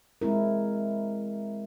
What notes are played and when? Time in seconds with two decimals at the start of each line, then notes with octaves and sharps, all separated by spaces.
0.22 G#3 C4 E4 A#4